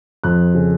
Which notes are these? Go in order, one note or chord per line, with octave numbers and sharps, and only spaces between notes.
F2 F#6
C#3